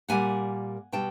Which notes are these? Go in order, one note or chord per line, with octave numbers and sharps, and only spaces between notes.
A#2 G3 A#3 F#5 G#5
B2 G3 G5 A5